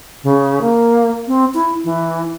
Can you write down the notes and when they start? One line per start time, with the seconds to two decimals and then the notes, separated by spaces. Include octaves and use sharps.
0.23 C#3
0.61 A#3
1.28 C4
1.54 E4
1.84 E3